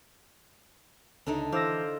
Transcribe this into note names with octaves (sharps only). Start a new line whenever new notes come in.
C#2 D3 D4 D#4
E3 F4 C5 D6 E6 A#6